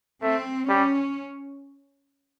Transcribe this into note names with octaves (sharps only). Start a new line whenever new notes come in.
A3 C4
G3 C#4